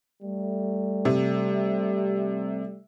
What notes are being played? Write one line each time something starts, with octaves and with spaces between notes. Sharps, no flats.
G3 A3
C3